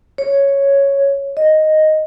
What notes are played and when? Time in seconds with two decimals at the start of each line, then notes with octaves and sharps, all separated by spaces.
0.18 C#5
1.37 D#5